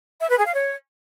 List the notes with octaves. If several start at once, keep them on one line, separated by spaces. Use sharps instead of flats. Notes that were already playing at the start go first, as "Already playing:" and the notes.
E5
B4
G#4
F5
C#5